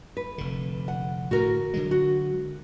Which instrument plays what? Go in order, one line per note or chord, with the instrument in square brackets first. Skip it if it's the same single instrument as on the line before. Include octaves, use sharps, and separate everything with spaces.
[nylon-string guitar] B4
[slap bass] F1 D3
[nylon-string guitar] F#5
[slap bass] A2 D3 [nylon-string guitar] F#4 A#4
[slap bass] D3 F#3 G#3
[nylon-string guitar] F#4